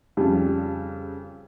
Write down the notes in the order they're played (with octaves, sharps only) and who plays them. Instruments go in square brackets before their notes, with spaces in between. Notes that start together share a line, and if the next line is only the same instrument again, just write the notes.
[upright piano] F2 C#3 G3